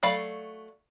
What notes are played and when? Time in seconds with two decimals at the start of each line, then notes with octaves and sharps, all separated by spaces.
0.03 F#3 A3 D5 F5 B5